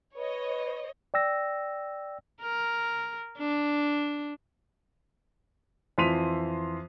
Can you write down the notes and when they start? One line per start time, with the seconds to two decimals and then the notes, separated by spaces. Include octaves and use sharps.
0.16 B4 C#5 D#5
1.14 D5 G5 E6 A#6
2.42 A#4
3.38 D4
5.98 F2 E3 C6 B6 D#7 F7